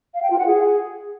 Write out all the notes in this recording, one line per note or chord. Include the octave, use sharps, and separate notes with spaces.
F5
G5
F4
F#5
G#4